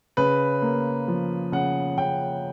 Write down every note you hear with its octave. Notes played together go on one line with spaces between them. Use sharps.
C#3 B4
A#3
F3
C#3 F#5
C#3 G5